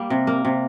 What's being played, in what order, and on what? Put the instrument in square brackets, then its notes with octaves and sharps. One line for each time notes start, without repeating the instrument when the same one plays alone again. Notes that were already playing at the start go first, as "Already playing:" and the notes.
Already playing: [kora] G3 A#3
C3
A#3
C3